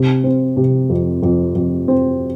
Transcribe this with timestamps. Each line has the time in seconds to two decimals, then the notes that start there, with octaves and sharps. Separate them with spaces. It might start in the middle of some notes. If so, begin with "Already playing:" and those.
Already playing: C3
0.24 C4
0.57 C3
0.90 F2
1.22 F2
1.55 F2
1.88 C4